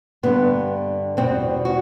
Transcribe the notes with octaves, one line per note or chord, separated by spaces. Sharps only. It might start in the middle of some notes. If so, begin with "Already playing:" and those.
G2 D3 G3 B3
E2 B2 G3 C4
F#4